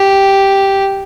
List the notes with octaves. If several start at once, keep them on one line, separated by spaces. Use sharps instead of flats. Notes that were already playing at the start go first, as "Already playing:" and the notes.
Already playing: G4